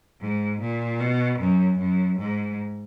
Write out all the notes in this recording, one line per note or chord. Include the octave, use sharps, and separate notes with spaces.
G#2
A#2
B2
F#2
F#2
G#2